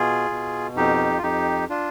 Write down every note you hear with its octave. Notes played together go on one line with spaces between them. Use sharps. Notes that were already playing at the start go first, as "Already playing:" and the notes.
Already playing: B2 F4 G#4
B2
F2 D#4 G4
F4
F2 D#4 G4
D4 F4